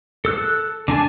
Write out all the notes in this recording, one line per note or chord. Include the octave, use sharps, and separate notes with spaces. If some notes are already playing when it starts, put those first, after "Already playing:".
A4 E6 F#6
D3 D4 G#5 A5